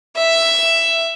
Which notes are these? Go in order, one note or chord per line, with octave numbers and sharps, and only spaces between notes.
E5